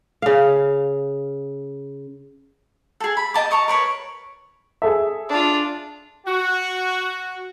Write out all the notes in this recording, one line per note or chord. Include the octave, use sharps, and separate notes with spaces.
C#3 F5
G#4 A4
B5
G4 D#5 A5 D6
A5 A#5 C#6 D#6
A#4 B4 C#5
G#4 A4 E5
D4 F4
F#4